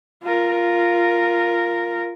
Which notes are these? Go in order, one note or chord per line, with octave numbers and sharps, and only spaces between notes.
F4 A#4